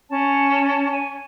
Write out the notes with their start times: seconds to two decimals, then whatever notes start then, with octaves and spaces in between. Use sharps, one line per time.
0.11 C#4 C#5 A5
0.90 G#5